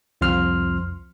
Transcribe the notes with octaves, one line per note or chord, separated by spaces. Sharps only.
C2 F2 F3 C6 F6